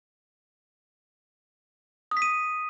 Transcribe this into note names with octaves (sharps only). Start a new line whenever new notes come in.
D#6
B6
D#7